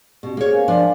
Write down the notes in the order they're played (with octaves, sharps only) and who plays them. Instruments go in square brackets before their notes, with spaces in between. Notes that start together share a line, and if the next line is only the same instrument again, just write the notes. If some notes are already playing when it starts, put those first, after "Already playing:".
[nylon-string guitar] B2 [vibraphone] C#4 F#4 G4
[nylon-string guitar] A#3 C#5 [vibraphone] G#4 C5
[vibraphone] A#4 F5 G#5
[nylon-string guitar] F3 D4